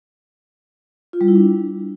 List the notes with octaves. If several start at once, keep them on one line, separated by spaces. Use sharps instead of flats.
F4
G3
E4
D4